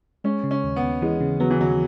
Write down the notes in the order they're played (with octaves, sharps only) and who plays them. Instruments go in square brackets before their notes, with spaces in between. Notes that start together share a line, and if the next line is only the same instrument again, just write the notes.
[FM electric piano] G#3 [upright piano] C#4
[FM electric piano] C#3
[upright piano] C#4
[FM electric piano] D#2
[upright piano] B3
[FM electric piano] D#2
[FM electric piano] E3 [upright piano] G#3
[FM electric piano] C#3
[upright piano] F#3 [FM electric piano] B3
[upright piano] E3
[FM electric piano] D#2 [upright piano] F#3